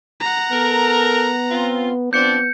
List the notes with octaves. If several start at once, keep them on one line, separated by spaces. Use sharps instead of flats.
F#5 A#5
B3 A4 A#4
C4 F4
F3 B3 C4 D4 G6 C#7